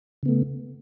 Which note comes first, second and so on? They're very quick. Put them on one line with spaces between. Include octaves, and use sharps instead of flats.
C#3 B3 A3